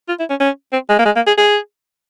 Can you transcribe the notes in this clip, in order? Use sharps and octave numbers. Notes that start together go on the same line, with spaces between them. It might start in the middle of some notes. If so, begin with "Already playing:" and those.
F4
E4
C#4
C#4
C4
G#3
A#3
G#3
A#3
G#4
G#4